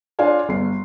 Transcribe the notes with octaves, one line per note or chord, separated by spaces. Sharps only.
D4 F4 C#5 D5 F5 G#5
G1 C7